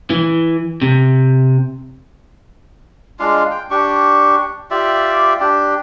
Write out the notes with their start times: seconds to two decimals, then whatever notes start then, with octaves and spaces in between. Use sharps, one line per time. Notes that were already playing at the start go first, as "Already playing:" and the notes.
0.10 E3
0.82 C3
3.19 G#3 D4 F4 F5
3.51 G5
3.70 D4 G4 C#6
4.71 F4 G4 D5 E5
5.40 D4 G4